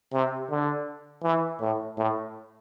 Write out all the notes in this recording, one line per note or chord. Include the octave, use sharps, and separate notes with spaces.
C3
D3
E3
A2
A2